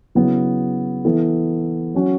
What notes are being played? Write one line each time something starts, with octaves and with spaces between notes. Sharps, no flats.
C#3 F#3 B3 E4
E3 B3 E4 A4
F#3 C#4 F#4